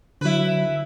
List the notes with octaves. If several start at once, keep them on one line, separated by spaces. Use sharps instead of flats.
D3 F#3 E4 B4